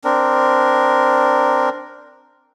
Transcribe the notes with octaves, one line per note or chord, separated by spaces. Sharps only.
C4 D4 A#4